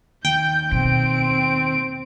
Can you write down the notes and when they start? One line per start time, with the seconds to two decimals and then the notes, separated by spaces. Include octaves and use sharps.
0.25 D#2 G5 G6
0.72 B2 C4 D7